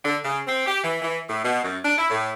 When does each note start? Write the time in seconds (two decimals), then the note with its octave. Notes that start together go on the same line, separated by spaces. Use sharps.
0.04 D3
0.24 C#3
0.46 C4
0.66 G4
0.83 E3
1.02 E3
1.28 A2
1.44 B2
1.63 F#2
1.83 D4
1.98 E4
2.10 A2